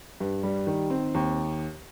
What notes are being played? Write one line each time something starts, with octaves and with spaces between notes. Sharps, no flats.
G2
G3
D#3
C4
D#2